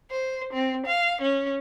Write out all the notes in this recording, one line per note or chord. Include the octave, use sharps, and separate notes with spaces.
C5
C4
F5
C#4